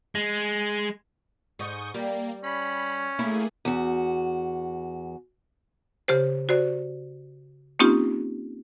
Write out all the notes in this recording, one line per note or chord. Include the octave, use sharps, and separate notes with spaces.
G#3
G#2 C#6 D#6 G6
G3 A#3
C#4 B5
A3 A#3 E4 G#4
E2 F#4
C#3 G4 C5
F#4 C5 D5
A#3 C4 C#4 D#4 F4 G4